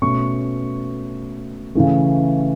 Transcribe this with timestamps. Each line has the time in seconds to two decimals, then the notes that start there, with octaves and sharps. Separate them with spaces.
0.02 B2 A3 C#4 C#6
1.75 C#3 E3 A3